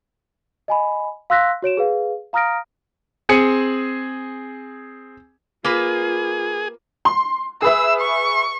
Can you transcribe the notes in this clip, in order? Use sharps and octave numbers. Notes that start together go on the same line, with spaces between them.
D#5 G#5 B5
F5 C6 E6 F#6 A#6 B6
F#4 C#5 D7 E7
G#4 B4 F5
F5 A#5 D#6 F6 A#6 D7
C4 G#4 G#5 C#7
A#3 F4 G#4 B4
C6
G#4 B4 E5 E6
C#6